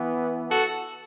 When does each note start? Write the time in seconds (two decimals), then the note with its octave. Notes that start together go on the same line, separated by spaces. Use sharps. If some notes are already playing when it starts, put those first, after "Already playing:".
Already playing: E3 B3
0.49 F#4 A4